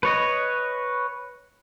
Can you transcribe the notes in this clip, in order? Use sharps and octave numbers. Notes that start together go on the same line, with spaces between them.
B4 C#5 D#5